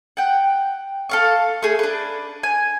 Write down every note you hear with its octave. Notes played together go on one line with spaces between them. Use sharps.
F#5 G5
A4 F5 C#6
A3 G#4
D4 B4
G#5